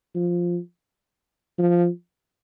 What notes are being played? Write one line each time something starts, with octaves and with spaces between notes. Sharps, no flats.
F3
F3